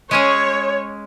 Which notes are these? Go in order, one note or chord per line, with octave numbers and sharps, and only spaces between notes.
G#3 C#4 G#4 C#5